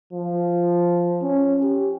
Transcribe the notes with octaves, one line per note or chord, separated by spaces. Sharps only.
F3
C#4
G4